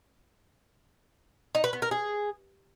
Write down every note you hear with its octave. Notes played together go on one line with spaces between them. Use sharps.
D#4
B4
B3
A#4
G#4